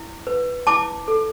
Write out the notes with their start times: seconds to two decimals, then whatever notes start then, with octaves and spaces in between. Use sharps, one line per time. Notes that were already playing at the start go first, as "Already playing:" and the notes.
Already playing: E4
0.27 B4
0.67 E4 A5 D6
1.08 A4